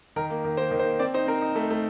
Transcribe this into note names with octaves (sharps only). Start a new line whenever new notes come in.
D#3 A#4
A#3
D#3
A#3 C5
D#3
C5
A#3
C4 D5
D#4 C5
C4 A#4
D#4
A3
A3